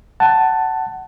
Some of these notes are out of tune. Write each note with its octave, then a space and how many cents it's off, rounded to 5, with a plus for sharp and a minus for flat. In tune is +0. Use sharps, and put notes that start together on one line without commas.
F#5 +20 A5 +5